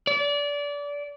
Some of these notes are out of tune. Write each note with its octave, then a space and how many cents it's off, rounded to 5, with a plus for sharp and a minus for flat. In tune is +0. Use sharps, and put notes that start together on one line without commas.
D5 -25